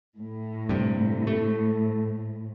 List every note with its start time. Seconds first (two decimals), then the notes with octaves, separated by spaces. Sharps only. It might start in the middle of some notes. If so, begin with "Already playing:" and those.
0.18 A2
0.69 G2 C3
1.27 A3